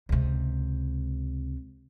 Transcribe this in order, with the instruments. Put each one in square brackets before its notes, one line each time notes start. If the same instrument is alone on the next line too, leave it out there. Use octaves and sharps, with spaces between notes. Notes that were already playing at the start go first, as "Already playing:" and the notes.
[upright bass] C#2 C3